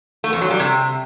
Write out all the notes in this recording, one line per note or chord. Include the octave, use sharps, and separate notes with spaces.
A3
F2
F#3
G3
C3